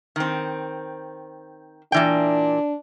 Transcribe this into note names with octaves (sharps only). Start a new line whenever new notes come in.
D#3 C4
A#2 E3 D4 G5